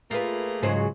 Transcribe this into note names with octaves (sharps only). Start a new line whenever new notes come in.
A3 A#3 F4 G#4 B4
C#2 G#2 C#3 F#3 G#3 C5